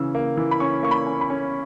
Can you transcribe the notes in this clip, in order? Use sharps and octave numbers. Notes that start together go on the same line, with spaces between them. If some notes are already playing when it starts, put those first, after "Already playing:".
Already playing: C#3 E3 E6
A#3
E3
B5
C#4 C#6
A#3 C#6
B5
C#4
B5
C#4